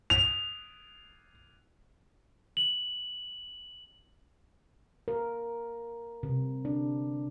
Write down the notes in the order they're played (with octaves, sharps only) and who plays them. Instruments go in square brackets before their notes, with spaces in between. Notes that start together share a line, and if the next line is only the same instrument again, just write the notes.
[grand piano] F7
[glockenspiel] F#7
[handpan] A#4
C3
D4